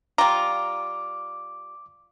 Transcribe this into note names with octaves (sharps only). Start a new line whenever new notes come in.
G3 F4 A#5 D6